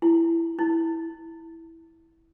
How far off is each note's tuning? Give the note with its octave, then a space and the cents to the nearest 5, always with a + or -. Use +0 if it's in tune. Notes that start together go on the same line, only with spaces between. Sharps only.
E4 +15
E4 -5